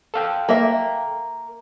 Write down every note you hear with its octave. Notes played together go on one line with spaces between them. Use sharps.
A4 F5 G5
A#3 E5